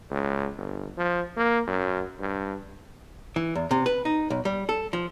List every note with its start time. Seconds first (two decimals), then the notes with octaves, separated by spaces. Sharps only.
0.11 C#2
0.57 G1
0.97 F3
1.37 A#3
1.67 F#2
2.20 G2
3.36 E3
3.55 E2
3.71 C3
3.86 B4
4.05 D#4
4.30 B1
4.45 G3
4.69 A4
4.93 F3